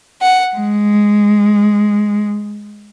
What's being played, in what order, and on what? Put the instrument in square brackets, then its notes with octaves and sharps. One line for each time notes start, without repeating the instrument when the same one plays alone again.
[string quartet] F#5
G#3